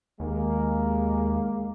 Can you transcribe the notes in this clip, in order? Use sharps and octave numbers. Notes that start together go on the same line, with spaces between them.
D#2 G#3 A#3